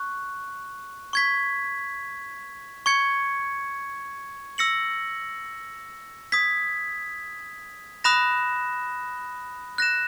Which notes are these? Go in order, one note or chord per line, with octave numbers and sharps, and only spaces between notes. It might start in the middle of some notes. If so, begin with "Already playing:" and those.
Already playing: C#6 F#6
C#6 G#6 B6
C#6 G#6 C#7
E6 A#6 C#7 F#7
D#6 G#6 B6
B5 D#6 F#6 A#6 E7
F#6 A#6 E7